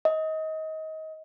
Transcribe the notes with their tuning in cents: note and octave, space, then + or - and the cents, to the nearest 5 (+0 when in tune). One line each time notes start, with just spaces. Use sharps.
D#5 +25